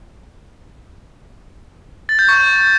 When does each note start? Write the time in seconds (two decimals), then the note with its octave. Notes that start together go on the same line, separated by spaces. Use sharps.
2.09 A6
2.19 G6
2.29 C#6